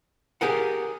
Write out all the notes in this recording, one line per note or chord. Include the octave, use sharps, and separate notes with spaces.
G4 G#4 A#4 F#5